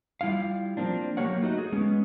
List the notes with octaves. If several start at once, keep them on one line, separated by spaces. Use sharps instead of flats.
G3 E4 F4 F5
F3 A#3 C4 D4
F#3 A#3 G4 A#4 C#5 F#5
A3 D#4 F#4 D#5
G#4
G#3 B3 C#4